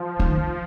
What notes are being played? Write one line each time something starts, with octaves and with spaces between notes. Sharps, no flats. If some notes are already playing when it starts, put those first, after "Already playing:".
Already playing: F3
D#3